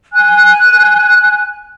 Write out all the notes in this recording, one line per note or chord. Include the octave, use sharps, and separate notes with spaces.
G#5 F#6